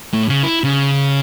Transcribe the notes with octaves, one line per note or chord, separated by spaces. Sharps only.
A2
C#3
E4
C#3